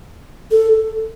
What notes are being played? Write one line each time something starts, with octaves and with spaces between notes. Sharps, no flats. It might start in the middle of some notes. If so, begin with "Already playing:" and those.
A4